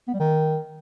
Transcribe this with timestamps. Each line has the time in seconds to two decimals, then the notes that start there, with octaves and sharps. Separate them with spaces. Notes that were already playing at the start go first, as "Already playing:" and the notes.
0.08 B3
0.14 G3
0.20 D#3